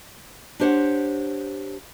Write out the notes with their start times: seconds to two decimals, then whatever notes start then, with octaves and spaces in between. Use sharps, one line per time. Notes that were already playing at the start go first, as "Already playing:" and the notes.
0.60 D4 G4 C5 C#5 F#5